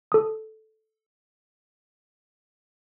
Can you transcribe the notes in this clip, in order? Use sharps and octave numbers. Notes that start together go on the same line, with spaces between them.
A4 D#6